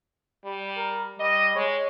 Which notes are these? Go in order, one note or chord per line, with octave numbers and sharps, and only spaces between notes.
G3
A#4
G3 D#5
G#3 C#5